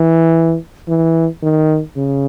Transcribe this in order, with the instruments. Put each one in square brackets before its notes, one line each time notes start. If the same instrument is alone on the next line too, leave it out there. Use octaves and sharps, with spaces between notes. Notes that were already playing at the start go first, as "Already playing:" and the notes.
Already playing: [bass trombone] E3
E3
D#3
C#3